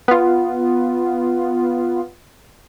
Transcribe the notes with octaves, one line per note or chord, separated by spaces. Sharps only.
B3 F4